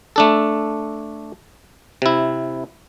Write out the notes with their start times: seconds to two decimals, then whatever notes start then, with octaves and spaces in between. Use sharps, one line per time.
0.16 A3 D4 A4
2.02 C3 E4